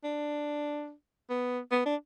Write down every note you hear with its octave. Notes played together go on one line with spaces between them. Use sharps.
D4
B3
B3
D4